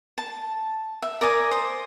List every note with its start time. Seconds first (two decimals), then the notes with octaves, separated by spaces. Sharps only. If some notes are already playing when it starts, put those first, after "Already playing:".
0.18 A5
1.02 E5
1.21 A#4 D5 G#5 D#6
1.51 C5 D#6